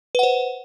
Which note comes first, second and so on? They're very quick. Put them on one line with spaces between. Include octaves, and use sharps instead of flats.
B4 F#5 C5